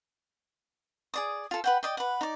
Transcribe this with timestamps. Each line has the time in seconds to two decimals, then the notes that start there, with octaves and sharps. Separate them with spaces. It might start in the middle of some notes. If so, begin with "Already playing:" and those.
1.14 G#4 D5 D#6
1.51 F4 A4
1.64 B4 F#5 G5
1.83 D5 D#5 G5
1.97 B4 F#5
2.21 D#4 D5